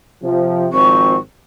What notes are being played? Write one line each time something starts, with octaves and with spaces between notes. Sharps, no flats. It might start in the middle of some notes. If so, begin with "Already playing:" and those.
C3 F3
G#1 F3 C4 C#6